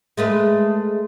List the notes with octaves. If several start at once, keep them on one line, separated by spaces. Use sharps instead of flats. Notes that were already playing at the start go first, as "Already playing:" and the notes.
G#3 A3 B4